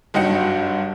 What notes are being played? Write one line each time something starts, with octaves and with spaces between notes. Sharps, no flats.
F#1 G2 D#4 F#4 F#5 C#7